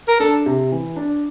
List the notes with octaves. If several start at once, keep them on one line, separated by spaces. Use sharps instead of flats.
A#4
D4 A4
C3
E3
D4